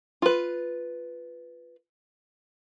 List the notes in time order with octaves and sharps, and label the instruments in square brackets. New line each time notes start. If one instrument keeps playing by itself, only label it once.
[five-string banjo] F4 B4